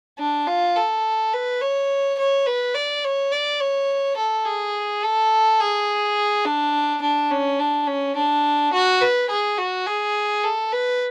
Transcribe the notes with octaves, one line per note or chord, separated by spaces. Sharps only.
D4
F4
A4
B4
C#5
C#5
B4
D5
C#5
D5
C#5
A4
G#4
A4
G#4
D4
D4
C#4
D4
C#4
D4
F#4
B4
G#4
F#4
G#4
A4
B4